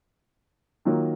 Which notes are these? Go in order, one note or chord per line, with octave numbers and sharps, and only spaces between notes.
D#3 F#3 A#3 F4